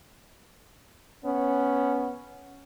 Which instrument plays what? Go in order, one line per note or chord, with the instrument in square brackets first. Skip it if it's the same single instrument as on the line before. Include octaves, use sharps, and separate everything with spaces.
[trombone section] B3 C#4